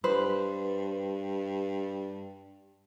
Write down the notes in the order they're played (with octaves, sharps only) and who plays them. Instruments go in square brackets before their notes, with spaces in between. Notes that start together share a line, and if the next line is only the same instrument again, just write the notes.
[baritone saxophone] G2 [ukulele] B4 C5